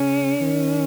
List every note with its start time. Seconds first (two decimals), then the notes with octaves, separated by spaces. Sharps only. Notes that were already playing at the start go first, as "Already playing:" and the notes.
Already playing: C#3 C#4
0.41 D#3